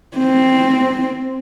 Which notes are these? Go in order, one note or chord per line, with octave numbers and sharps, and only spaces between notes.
C4